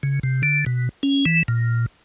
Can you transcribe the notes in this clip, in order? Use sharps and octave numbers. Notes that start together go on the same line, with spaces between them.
C#3
C3
D3
B2
C#4
E3
A#2